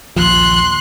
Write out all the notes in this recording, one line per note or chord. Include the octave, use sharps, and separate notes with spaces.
A#1 D#2 F3 C6 F#6